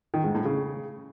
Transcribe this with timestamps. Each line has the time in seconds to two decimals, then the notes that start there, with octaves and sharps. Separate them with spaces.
0.14 D#3
0.24 G#2
0.35 A2
0.45 C#3